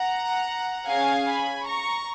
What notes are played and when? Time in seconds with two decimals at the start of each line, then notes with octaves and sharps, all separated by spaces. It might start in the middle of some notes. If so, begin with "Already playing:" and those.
Already playing: F#5 A#5
0.88 C#4 G#4 F5 G#5
1.28 G#5 B5
1.66 A#5 C#6